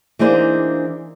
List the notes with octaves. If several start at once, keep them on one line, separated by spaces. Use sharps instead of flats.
E3 A#3 D4 D#4 G#4 C5